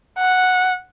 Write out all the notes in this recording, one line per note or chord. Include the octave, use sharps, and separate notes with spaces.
F#5